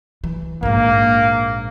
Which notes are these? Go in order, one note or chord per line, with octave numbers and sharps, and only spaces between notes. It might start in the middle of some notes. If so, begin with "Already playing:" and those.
E3
A#1 G#2 A#3